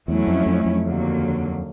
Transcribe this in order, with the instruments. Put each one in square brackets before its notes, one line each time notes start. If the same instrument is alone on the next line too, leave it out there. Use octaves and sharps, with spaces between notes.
[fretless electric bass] E2 [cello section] F#3 A3 C#4 E4
[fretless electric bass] F2
F2
F2
[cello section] D#2 D3 F#3 A#3